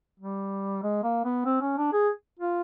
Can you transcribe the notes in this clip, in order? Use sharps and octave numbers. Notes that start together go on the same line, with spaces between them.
G3
G#3
A#3
B3
C4
C#4
D4
G#4
F4